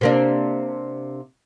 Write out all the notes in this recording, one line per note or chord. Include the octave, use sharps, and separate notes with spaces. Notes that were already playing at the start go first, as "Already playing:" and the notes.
C3 A#3 D4